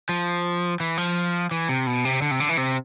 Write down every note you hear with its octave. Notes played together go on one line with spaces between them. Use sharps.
F3
E3
F3
E3
C3
B2
C3
D3
C3
D3
E3
C3